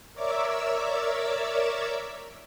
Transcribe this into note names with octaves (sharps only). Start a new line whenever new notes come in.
A#4 C#5 D5 E5 D6 E6